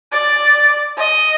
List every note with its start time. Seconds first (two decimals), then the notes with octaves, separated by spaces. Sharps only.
0.12 D5
0.97 D#5